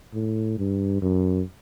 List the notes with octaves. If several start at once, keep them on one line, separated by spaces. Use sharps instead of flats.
A2
G2
F#2